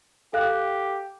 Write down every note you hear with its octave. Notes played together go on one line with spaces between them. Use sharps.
G4 A4 F5 F#6